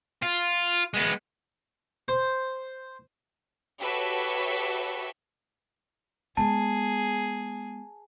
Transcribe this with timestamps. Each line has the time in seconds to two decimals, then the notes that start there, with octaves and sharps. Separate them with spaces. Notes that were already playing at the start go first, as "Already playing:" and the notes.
0.23 F4
0.94 G#3 B3
2.08 C5
3.81 F#4 G4 A4 B4 C#5 E5
6.37 G#3 B3 G#4 A5